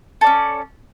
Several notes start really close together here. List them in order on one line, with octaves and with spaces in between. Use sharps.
A4 D5 C#4